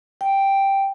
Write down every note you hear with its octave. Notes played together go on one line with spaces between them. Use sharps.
G5